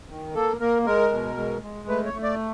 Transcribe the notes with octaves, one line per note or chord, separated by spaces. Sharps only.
D#3
A#3 A4
A#3 A#4
G#3 A#4
B2
G#3
G#3
A3 B4
C#5
A3
D5